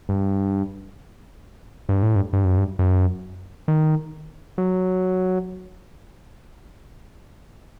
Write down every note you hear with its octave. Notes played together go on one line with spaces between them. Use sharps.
G2
G2
A2
G2
G2
F#2
G2
F#2
D#3
F#3